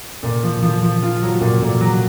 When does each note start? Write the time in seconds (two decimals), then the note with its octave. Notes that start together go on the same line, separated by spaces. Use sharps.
0.23 A#2
0.43 F3
0.62 F3
0.82 F3
1.03 F4
1.22 F#3
1.41 A#2
1.62 A#2
1.81 F#3